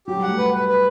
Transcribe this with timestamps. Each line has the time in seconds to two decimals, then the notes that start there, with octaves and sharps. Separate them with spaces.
0.07 F#3 G4
0.17 G3
0.23 F#5
0.28 A3
0.38 B4
0.53 B4
0.68 B4